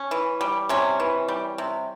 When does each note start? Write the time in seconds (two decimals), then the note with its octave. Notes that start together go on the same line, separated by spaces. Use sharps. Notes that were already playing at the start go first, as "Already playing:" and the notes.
Already playing: C#4
0.11 E3
0.41 G3
0.69 C3 C#4
1.00 E3
1.28 G3
1.58 C3